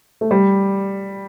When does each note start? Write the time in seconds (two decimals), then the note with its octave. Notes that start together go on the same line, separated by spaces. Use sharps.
0.21 A3
0.31 G3